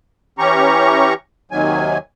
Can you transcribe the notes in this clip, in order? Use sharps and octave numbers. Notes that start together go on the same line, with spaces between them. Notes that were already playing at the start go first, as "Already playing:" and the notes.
E3 C#4 G4 A#5 C#6
D#2 C3 D#3 F#3 G#5